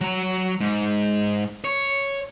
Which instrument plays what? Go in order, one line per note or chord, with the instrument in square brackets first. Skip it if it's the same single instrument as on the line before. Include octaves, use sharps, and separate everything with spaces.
[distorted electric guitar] F#3 A#5
G#2
C#5